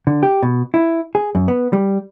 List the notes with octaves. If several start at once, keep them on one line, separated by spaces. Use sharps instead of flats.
D3
G4
B2
E4
G#4
F#2
B3
G3